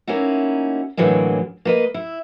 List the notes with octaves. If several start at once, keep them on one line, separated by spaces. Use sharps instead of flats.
A#3 C#4 D#4 E4 F#4
A2 D3 E3 F#3 G#3 A#3
A#3 B4 D#5
E4